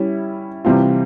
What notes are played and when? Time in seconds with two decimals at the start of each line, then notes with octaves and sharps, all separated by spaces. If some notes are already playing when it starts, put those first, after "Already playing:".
Already playing: G3 C#4 E4
0.65 C3 E3 G3 C4 F4